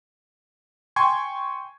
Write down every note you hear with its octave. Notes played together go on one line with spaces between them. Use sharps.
G5 G#5 C6 C#6 G#6